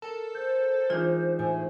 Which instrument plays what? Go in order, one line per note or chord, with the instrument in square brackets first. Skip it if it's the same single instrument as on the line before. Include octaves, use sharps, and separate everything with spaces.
[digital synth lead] A4 [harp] A#4
[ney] C5 [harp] G6
[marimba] E3 F4 [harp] G#3 D4 D#4
[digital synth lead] A2 [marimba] G#5